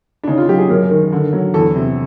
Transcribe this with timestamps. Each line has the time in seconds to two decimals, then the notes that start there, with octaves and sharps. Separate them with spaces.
0.23 D4
0.27 C#3 D#4
0.38 F4
0.49 F#3 G4
0.59 G#4
0.69 F#2 A#4
0.91 D#3
1.12 D3
1.33 F#3
1.54 E2 A4
1.76 C3